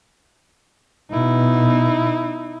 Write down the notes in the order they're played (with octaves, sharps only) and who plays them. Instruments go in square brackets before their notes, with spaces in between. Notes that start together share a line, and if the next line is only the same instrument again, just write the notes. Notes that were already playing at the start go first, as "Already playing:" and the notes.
[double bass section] B2 [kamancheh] D#4 E4